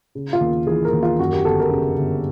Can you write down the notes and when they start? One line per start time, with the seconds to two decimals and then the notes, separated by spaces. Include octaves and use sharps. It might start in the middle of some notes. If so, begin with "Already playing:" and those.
0.15 C#3
0.33 F4
0.41 D#2
0.67 E3 G#4
0.85 A#4
0.93 D#2
1.03 F4
1.19 F#2 F#4
1.33 G4
1.45 G1 A4
1.59 A#4
1.71 C#3
1.97 G1